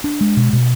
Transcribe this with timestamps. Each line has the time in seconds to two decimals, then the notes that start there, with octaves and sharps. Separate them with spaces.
0.04 D4
0.21 G#3
0.37 B2
0.53 B2